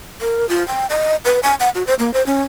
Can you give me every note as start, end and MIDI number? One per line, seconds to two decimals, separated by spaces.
0.21 0.49 70
0.49 0.66 65
0.68 0.86 79
0.90 1.16 75
1.25 1.40 71
1.43 1.55 80
1.60 1.70 78
1.75 1.85 66
1.87 1.94 72
1.99 2.13 58
2.14 2.25 72
2.26 2.43 61